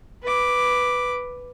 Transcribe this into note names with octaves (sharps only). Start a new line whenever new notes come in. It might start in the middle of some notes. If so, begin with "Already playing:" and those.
B4 D6